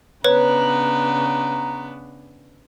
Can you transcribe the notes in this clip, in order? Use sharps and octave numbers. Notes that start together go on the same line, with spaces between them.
C#3 B3 D4 B4 C#5 A#5